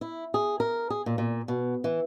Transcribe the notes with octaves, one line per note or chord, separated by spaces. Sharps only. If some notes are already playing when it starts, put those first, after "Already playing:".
E4
G#4
A#4
G#4
A#2
A#2
B2
E3